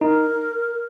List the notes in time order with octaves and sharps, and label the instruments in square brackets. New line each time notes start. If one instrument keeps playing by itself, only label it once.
[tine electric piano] D#4 [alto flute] A#4